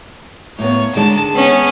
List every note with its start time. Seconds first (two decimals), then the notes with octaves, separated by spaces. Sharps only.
0.59 A2 A#3 B3 C#5
0.95 D3 D#3 G#3 A5
1.33 B3 C#4